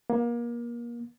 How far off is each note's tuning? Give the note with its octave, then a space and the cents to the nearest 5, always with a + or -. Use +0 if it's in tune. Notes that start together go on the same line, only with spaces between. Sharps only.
A#3 +30